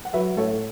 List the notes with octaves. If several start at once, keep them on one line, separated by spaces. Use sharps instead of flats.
F#5
F#3 B4 E5
A2 A4 C#5